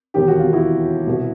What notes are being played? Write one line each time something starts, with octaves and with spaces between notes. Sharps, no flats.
E1 D#2 D#3 G4
F#4
F4
E4 F#4
C2 B2